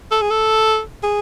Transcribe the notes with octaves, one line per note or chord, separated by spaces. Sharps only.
A4
G#4
A4
G#4